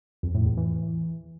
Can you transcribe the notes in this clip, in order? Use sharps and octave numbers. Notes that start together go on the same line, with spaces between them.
F2
A2
E2
E3